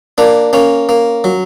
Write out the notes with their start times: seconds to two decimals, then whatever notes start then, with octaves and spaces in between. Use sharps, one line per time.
0.18 A#3 D4
0.53 A#3 C#4
0.89 A#3
1.24 F#3